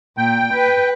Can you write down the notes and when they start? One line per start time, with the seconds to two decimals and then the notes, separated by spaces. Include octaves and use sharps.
0.18 A#2 G5
0.54 B4